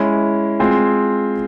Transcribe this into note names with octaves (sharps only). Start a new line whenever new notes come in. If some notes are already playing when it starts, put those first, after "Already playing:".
Already playing: G#3 C#4 E4
G#3 C4 F4 G#4